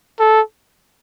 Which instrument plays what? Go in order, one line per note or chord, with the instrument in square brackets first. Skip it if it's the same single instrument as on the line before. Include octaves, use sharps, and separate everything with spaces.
[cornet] A4